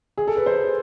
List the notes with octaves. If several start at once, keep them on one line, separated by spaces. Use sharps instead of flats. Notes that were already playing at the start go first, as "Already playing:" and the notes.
G#4
A4
B4
C5